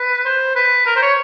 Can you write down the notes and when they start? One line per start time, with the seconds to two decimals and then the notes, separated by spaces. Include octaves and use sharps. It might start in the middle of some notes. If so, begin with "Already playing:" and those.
Already playing: B4
0.25 C5
0.55 B4
0.86 A#4
0.96 C5
1.02 C#5